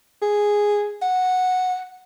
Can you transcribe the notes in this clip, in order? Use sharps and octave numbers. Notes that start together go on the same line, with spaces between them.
G#4
F#5